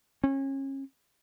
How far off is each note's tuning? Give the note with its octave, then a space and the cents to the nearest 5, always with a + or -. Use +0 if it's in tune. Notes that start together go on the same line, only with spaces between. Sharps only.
C#4 -30